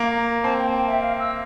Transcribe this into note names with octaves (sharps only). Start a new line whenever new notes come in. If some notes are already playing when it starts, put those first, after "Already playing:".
Already playing: A#3 A#5
C4 A5
G5
G5
E5
F5
E6